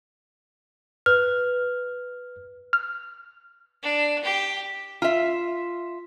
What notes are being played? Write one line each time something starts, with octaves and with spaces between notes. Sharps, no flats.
B4 F6
F6
D4
G4
F4 E5